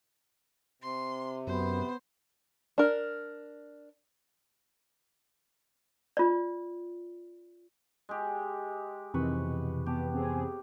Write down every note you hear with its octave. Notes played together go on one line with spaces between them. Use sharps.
C3 C6
F#2 B3 C5
D4 A#4
F4 D5
G#3 G4
F2 C3 D#3 E3 C4 B4 C#6
B2
B3 G4 A5
B3 C4 G#4